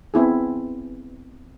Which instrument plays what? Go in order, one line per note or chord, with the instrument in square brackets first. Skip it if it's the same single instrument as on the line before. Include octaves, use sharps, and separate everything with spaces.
[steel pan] B3 C4 E4 G#4